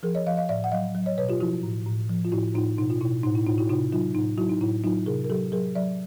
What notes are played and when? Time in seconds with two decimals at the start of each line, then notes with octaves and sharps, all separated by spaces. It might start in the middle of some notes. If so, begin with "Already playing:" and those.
0.03 F3 G#4 A#4
0.15 C#5 D#5
0.26 F3 D#5 F5
0.37 D#5 F5
0.49 A2 D5 E5
0.64 F#5
0.72 F#3 D#5 F5
0.94 F#3
1.06 C#5 D#5
1.18 B2 B4 C#5
1.29 F4 G4
1.40 F3 E4 F#4
1.63 A2
1.86 A2
2.09 F3
2.25 F4
2.32 A2 E4 F#4
2.55 A2 D#4 F4
2.78 B2 D#4
2.90 F4
3.01 B2 E4
3.23 A2 D#4
3.35 E4
3.46 A2 D#4 F4
3.58 E4 F#4
3.69 C3 D#4 F4
3.92 F#3 D#4 F4
4.15 A2 D#4
4.38 F#3 E4 F#4
4.49 D#4
4.61 A2 E4
4.84 F#3 D#4 F4
5.06 C3 G#4 A#4
5.24 A#4
5.30 F#3 G4 A4
5.52 F#3 G#4 A#4
5.75 F#3 D5 E5